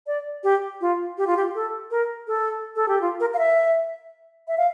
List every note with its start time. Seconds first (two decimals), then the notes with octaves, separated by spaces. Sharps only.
0.07 D5
0.44 G4
0.81 F4
1.18 G4
1.27 F4
1.37 G4
1.55 A4
1.91 A#4
2.27 A4
2.76 A4
2.88 G4
3.01 F4
3.20 A#4
3.34 F5
3.38 E5
4.48 E5
4.58 F5